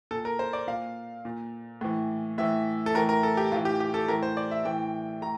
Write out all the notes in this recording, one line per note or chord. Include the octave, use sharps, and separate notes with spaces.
A#2 A4
A#4
C5
D5
A#2 F5
A#2
A2 E3
A2 E3 E5
A4
A2 E3 A#4
A#4
A4
G4
A2 E3 F4
G4
G4
A4
A2 E3 A#4
C5
D5
E5
A2 E3 G5
A2 A#5